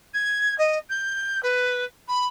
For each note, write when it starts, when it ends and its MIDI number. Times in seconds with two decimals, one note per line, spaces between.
0.14 0.56 92
0.58 0.78 75
0.89 1.40 91
1.42 1.84 71
2.08 2.26 83